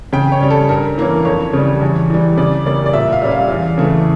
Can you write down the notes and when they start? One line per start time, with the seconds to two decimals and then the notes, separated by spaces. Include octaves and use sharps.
0.13 C#3 G5
0.32 C#5
0.41 G3 C#4
0.50 A4
0.69 G2 A#4
0.98 E3 A#3 C#4
1.25 F2 C#5
1.53 C#3 G3
1.81 E2
2.10 E3 G3
2.37 C#3 D5
2.66 G3 A#3 C#4 D5
2.86 D5
2.94 A#2 E5
3.13 F5
3.22 G3 C#4
3.31 F5
3.50 E2
3.78 C#3 E3 A3